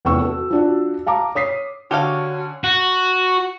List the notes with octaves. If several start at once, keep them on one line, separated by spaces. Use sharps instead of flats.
F1 E2 C#4 G5 C#6 E6
F#4 A4
F3 D4 F#4
F5 A5 A#5 D6
C#5 D#6 B6 C7
D3 C#4 F#4 G4 A4 F5
F#4